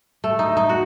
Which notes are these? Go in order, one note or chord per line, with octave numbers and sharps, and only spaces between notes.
A3
D#4
D#4
F#4